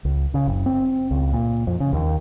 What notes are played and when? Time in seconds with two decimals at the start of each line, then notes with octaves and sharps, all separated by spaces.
0.05 C#2
0.34 C#3
0.47 F#1
0.66 C4
1.11 C#2
1.33 A#2
1.67 F2
1.80 C#3
1.93 D#2